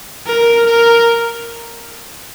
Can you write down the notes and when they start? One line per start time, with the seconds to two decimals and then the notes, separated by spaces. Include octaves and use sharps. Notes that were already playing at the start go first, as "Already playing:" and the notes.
0.27 A#4
0.67 A#4